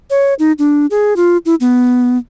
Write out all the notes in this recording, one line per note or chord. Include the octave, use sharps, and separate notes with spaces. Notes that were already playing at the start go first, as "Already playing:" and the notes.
C#5
D#4
D4
G#4
F4
E4
B3